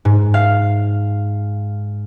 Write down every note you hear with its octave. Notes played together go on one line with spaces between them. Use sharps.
G#2
F5